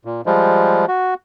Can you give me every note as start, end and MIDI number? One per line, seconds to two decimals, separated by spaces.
0.05 0.21 46
0.26 0.86 53
0.26 0.86 55
0.26 0.86 56
0.88 1.14 66